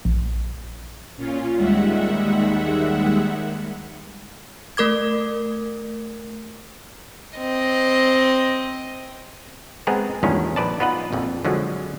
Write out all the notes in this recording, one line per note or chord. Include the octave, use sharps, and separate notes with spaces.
A#1
A#2 C#4 F4
D#2 D#3 G3 G#3 E5 F#5
A3 A#4 D6 G#6
C4 D#5
G#3 B3 C4 G#4 A#4
E2 G2 A#2 D#3 G#3 C#4
A#1 B4 D5 A5
B3 D#4 F4 B4 D#5 F#5
A#1 F2
D3 F3 F#3 G#3